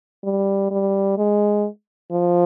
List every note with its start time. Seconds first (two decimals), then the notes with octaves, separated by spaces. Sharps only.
0.24 G3
0.71 G3
1.18 G#3
2.12 F3